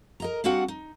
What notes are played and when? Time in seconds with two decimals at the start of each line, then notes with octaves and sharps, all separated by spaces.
0.20 A#4 D#5 A#5
0.44 G3 C4 D4 F#4 F5 F#5
0.68 D#4